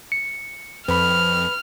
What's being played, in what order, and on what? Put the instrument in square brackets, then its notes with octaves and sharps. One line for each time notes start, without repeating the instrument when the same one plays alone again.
[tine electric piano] C#7
[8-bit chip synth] F2 [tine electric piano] B4 B5 [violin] F6